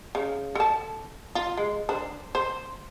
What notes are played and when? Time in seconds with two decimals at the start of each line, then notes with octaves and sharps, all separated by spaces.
0.15 C#3
0.55 A4 A5
1.35 F4
1.57 G#3
1.89 D4 C5
2.35 C5